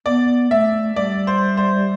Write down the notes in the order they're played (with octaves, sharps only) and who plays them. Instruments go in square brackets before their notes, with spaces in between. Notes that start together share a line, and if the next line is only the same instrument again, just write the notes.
[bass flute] B3 [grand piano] D5
[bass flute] A3 [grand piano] E5
[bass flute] G3 [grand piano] D5
[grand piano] C5
C5